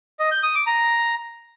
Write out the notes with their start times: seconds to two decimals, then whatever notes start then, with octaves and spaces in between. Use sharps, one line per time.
0.19 D#5
0.31 G6
0.43 D#6
0.55 D6
0.67 A#5